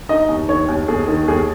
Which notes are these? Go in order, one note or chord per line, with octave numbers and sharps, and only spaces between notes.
D#4 D#5
D#2
D#3 C#5
D#2
D#2 G#4
D#3
D#2 G#4